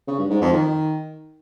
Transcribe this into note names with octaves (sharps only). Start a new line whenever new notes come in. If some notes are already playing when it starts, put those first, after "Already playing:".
C#3
G2
G#2
F2
D#3